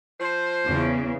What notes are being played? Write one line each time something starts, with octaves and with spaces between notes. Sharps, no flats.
F3 C5
E2 C#3